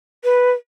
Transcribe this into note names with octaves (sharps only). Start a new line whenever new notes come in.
B4